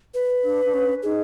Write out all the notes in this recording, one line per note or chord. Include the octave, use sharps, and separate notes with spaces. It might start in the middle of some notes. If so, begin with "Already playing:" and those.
B4
D4
D4
C#4
D#4 G#4